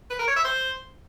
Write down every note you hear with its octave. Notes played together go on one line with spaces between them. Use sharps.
B4
A#4
C#5
E5
C5